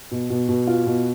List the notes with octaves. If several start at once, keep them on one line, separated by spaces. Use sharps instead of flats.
B2
B2
B2
F4
B2